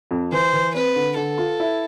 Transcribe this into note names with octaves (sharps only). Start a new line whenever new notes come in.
F2
E3 C5
E3
C4 B4
D3
D3 A4
F4
E4